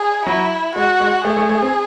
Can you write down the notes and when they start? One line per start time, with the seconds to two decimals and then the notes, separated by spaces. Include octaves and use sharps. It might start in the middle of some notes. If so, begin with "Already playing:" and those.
Already playing: G#4
0.26 F#3 E4
0.76 G#3 F#4
1.00 G#3
1.24 A3 G#4
1.37 A3
1.49 A3
1.62 C4